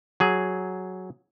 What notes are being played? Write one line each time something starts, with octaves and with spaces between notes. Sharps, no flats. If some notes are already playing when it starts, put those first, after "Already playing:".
F#3 G#4